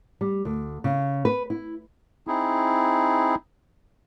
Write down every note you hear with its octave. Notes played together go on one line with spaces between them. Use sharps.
G3
D2
C#3
B4
E4
C4 D#4 E4 G#4